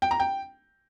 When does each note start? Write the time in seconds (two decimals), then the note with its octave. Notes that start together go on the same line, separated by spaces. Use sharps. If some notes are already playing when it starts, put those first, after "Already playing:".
0.02 G5
0.11 A#5
0.20 G5